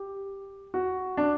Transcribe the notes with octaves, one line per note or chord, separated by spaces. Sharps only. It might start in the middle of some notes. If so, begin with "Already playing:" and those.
Already playing: G4
F#4
D4